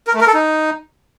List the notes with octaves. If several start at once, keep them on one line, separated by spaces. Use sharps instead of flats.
A#4
A3
A#4
A4
D#4